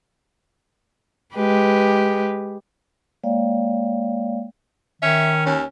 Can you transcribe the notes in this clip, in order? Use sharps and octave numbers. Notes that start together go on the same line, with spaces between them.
G#3 G4 B4
G#3 A#3 C#5 D5 F5 G5
D#3 C#4 E5
D#2 C#4